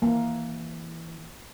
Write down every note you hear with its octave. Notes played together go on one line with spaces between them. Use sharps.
E3 A#3